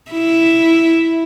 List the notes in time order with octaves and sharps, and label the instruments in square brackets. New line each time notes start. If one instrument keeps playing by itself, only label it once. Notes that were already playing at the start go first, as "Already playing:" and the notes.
[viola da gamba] E4